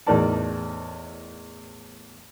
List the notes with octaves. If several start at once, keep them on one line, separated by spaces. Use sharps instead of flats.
E2 A2 D#4 A#4 D5 A5